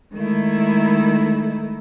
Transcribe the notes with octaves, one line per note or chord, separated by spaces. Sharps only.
D#3 G#3 A3 D#4 E4